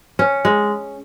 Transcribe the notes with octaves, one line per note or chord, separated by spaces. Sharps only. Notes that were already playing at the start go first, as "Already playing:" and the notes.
C#4
G#3